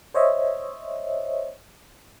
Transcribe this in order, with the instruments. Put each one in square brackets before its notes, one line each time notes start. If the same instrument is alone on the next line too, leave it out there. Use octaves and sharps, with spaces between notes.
[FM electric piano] C5 C#5 D#5 E5